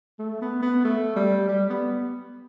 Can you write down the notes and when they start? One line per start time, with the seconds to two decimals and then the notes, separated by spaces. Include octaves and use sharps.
0.19 A3
0.42 B3
0.62 B3
0.85 A3
1.16 G3
1.48 G3
1.70 B3